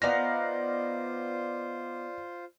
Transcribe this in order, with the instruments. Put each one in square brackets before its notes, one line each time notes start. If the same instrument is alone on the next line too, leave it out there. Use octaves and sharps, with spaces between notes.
[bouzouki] B3 D#4 F5 [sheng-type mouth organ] F4 C5 [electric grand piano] D5 A#6